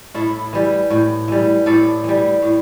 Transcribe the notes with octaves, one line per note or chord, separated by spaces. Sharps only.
A2 E4 A4
E3 G3
A2
E3 G3
A2 A4 D5
E3 G3
A2